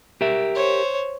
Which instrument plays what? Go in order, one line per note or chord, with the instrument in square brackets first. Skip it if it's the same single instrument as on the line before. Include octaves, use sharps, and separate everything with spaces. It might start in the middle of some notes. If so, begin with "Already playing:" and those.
[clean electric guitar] G4 A#4 E5
[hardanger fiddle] C5 C#5